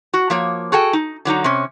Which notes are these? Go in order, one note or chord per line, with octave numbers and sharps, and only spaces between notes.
F#4
F3 A#3 C#5
F#4 G#4 A4 G5
D#4
D3 F#3 D#4 A#5
C3 C#4